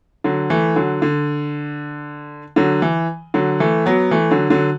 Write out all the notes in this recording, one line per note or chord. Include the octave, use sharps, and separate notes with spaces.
D3 F#3
E3 A3
D3 F#3
D3
D3 F#3
E3
D3 F#3
E3 A3
F#3 B3
E3 A3
D3 F#3
D3 F#3